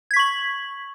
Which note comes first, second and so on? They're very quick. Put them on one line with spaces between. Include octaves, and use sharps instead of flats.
G#6 B6 C#6 F#7